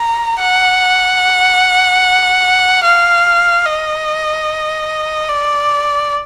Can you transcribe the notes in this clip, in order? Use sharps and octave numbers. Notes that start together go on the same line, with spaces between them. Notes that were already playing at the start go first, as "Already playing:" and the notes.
Already playing: A#5
F#5
F5
D#5
D5